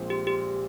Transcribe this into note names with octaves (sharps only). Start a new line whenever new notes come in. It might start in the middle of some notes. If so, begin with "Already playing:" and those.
Already playing: A#1 A#2 G#3 C4
G4
G4